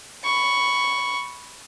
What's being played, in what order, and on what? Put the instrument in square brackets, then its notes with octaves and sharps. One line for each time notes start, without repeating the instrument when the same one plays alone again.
[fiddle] B5 C#6